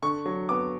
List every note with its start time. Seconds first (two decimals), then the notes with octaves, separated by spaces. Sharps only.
0.02 D3 C#6
0.26 F#3
0.49 B3 D6